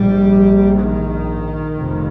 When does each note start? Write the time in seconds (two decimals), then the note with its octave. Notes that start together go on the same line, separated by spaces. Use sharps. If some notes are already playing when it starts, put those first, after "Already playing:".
Already playing: A#1 G#2 G3
0.78 D#3
1.76 F1 F2 C3